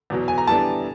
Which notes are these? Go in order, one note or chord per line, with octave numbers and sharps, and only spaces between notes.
E2 B2 F#3
G#5
A#5
E3 G3 B3 D4 A5